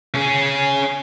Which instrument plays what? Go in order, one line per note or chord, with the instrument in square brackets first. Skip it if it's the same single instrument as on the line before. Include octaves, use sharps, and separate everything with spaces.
[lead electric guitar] C#4 G#4